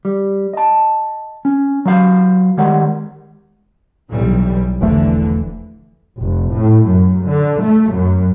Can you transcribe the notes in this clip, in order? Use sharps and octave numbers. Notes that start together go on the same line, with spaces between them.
G3
D#5 A5
C#4
F#3 F#4 B4 F5
D#3 G3 G#3 C#5 F#5
B1 E3 G3
E1 D3 E3 F3 A3
F1
A2
F#2
D3
A3
F#2